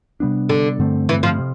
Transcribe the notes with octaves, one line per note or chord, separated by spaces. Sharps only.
C3 G3 B3 D4
D3
G2 D3 A3 C4
E3
F3
C3